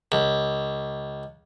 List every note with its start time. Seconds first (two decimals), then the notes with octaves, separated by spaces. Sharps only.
0.12 C#2